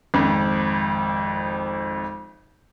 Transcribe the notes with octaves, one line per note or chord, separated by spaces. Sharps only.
G#1 F2